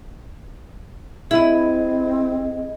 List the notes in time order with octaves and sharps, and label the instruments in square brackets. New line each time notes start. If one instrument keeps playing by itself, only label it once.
[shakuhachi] C4 [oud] E4 [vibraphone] G#4 D#5